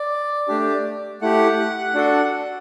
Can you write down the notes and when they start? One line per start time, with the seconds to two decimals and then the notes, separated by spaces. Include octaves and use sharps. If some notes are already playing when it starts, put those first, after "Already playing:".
Already playing: D5
0.48 A3 D4 G4
1.22 A3 E4 G4 F#5
1.95 D4 F#4 A4